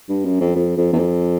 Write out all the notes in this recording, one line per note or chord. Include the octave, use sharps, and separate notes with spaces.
G2
F#2
F2
F2
F2
E2
F2